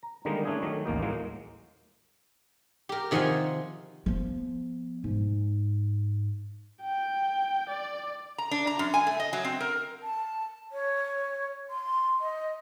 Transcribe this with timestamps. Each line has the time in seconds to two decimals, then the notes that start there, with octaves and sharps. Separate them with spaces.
0.03 A#5
0.25 D3 D#3 G3 G#3 A#3 D#4
0.45 A3 C#4 D4 E4 G#4
0.62 D#3 F#3 A3
0.86 A1 D#2 A#3 D#4
1.02 A2 F#3 G#3 A#3
2.89 G4 A#4
3.11 C3 D#3 F3 F#5 G#5 C6
4.06 F3 B3
5.04 G#2
6.82 G5
7.69 D5
8.38 A#5
8.51 D4
8.67 A#5
8.79 F#2
8.94 G#5
9.07 A3
9.20 D#5
9.33 F#3
9.45 C4
9.61 A#4
10.03 A5
10.72 C#5
11.70 C6
12.21 D#5